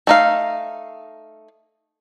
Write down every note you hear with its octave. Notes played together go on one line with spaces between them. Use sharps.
A3 D#4 F5